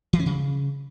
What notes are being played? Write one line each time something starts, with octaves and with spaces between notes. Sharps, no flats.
E3
C#4
C#3